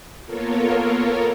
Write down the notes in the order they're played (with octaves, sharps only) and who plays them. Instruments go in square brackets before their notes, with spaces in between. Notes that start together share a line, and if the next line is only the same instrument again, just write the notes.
[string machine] A#3 B3 F4 A4 A#4 C#5